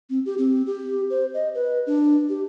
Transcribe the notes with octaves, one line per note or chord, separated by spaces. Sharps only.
C4
G4
C4
G4
C5
D#5
B4
D4
G4